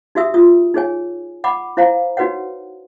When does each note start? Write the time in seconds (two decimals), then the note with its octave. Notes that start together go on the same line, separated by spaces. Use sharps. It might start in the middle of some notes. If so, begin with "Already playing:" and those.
0.15 D#4 F#4 G4 E5 D#6 E6
0.34 F4 D#6
0.74 D#4 G#4 C#5 G#5
1.44 F#5 B5 D6
1.77 E4 C5 F5 A#5
2.17 D#4 F#4 B4 C#5 F#5